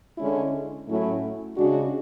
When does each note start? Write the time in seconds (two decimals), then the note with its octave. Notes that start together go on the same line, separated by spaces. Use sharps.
0.17 D3 G#3 C#4 E4
0.87 A2 F#3 A3 C#4 E4
1.56 C#3 G#3 D4 F#4